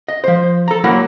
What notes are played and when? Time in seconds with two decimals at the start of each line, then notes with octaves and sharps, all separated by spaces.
0.08 D#5
0.24 F3 C5
0.68 A4 A#5
0.84 F#3 A#3 E4 A#4 F#5